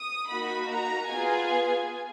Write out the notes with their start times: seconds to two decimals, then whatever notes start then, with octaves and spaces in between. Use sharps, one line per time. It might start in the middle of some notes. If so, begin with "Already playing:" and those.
Already playing: D#6
0.29 A#3 D#4 F#4 B5
0.69 A#5
1.10 B3 F4 G#4 G#5